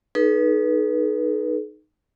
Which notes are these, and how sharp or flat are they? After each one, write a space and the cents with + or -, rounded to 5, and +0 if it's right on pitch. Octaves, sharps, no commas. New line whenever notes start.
D#4 -10 G#4 +45 B4 -25